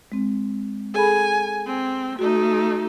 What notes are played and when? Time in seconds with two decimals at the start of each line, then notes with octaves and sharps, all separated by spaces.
0.12 G#3 C4
0.95 G#4 A4 G#5 B5
1.66 C4
2.19 A3 D#4 F#4